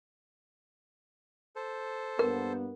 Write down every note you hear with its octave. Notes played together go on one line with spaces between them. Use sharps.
A4 C5
G2 A#3 B3 A#4